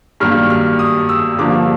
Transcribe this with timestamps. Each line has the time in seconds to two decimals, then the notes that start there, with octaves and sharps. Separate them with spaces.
0.20 G2 D#3 F#3 A#3 F6
0.50 F6
0.79 D#6
1.09 E6
1.38 G2 D3 F3 A#3 D6